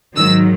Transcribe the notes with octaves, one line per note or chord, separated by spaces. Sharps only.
G#2 D#3 F#3 E6